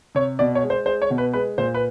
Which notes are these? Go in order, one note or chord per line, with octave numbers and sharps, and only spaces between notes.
C3 C#5
B2 D5
C#5
G#3
C5
G#3 C5
C#5
B2
B4
G#3 B4
A#2 C5
B4